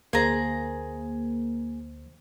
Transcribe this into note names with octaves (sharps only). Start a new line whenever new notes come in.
D2 A#3 G#4 C5 A#5